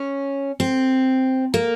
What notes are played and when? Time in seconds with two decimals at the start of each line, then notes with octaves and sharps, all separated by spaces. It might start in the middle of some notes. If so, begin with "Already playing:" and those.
Already playing: C#4
0.60 C4
1.54 A#3